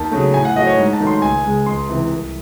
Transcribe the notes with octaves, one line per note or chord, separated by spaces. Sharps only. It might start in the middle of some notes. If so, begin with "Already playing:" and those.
Already playing: D#2 A5
C#3 F#3 A3
A2 G#5
F#5
F#3 A3 D#5
C#5
G#2
A5
D#3 F#3 A3
C6
C#2 G#5
C#3 G#3
C#2 C6
C3 E3
C2